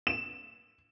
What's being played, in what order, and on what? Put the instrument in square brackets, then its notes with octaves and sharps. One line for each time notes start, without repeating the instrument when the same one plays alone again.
[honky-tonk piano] E7